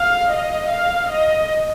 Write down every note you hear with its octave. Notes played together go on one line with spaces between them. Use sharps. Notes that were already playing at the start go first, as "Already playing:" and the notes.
Already playing: F5
D#5
F5
D#5